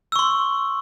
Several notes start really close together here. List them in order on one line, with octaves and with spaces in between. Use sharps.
E6 C#6 C6